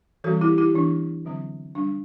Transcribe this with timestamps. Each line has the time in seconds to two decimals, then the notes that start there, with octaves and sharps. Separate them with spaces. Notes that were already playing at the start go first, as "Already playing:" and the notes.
0.24 E3 G3 C4 F#4 A4
0.41 E4 G4
0.58 E4 G4
0.74 E3 B3 D4
1.25 D3 F#3 C4
1.75 G3 D4